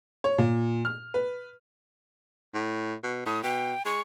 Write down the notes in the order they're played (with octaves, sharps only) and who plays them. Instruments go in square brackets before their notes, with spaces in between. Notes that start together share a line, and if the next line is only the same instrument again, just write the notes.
[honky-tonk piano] C#5
A#2
F6
B4
[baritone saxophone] A2
B2
[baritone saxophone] A2 [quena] D#6
[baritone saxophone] B2 [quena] G5
[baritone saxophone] G#3 [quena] C#6